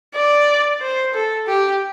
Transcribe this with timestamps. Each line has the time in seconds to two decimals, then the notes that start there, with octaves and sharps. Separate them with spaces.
0.15 D5
0.81 C5
1.14 A4
1.47 G4